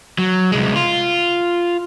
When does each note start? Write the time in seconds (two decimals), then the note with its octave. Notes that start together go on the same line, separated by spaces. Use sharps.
0.19 F#3
0.52 C2 G#3
0.76 F4